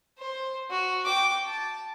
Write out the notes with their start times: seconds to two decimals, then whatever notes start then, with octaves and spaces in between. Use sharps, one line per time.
0.19 C5
0.70 F#4
1.05 G5 D6
1.46 A5